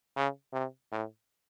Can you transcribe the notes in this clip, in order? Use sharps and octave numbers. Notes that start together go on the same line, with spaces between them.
C#3
C3
A2